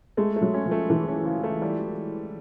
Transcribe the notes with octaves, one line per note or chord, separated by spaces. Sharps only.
G#3 A3
A3
F#3
C#4
F3
A3
E3 A3
C#4
C#3
A3
G3